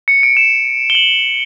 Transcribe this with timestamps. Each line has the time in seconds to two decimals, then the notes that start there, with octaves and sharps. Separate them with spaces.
0.08 C#7
0.23 D7
0.37 E7
0.90 G7
0.95 F#7